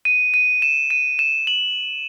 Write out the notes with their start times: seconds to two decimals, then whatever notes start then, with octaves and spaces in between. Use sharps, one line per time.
0.05 D#7
0.34 D#7
0.62 E7
0.90 D#7
1.19 E7
1.47 F#7